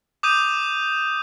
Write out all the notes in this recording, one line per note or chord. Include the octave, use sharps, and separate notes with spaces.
D6 D#6 G6 D#7